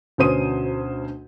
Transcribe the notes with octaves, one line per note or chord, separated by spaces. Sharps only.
D2 B2 C#4 C5 D#6 D#7